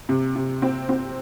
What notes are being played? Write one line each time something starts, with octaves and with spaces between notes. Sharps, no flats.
C3
C3
C4
C4